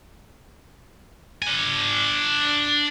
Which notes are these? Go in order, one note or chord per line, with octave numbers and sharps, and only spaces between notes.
D4 G#5